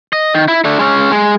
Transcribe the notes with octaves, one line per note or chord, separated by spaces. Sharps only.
D#5
D#3
E4
A3 D4
G#3 C#4
G#3